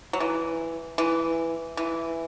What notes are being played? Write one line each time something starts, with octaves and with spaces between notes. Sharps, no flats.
F#3
E3
E3
E3